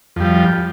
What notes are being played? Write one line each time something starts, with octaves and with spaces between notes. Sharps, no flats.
F2 F3 G3